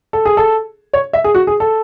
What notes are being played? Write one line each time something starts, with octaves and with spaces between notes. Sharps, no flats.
A4
G#4
A4
C#5
E5
G#4
F#4
G#4
A4